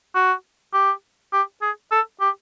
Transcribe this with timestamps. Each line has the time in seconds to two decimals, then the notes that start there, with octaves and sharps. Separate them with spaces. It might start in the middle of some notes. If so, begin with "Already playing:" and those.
0.15 F#4
0.73 G4
1.33 G4
1.62 G#4
1.92 A4
2.21 G4